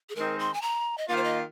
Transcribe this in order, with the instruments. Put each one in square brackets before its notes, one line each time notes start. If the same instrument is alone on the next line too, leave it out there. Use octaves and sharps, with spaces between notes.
[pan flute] G#4
[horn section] D#3 G#3 C4 D#4 [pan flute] A#4
[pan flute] C6
G#5
A#5
D#5
[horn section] D#3 A#3 F4 [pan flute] F5
[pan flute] C5
D#5